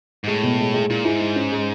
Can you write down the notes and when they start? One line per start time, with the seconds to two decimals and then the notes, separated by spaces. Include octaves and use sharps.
0.24 G#2
0.27 A2 G#3
0.43 B2
0.59 G#3
0.74 G#3
0.90 A#2 E4
1.05 G#2 E4
1.20 G#3
1.36 C#4
1.52 G#3